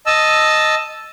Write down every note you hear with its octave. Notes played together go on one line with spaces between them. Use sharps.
D#5 A5 E6